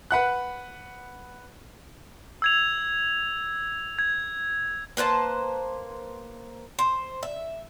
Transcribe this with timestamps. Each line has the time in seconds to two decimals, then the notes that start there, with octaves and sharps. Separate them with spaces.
0.11 B4 F#5 F#6
2.42 E6 G#6 F7
3.99 G#6
4.97 A#3 B4 C5 A5
6.79 C5
7.23 E5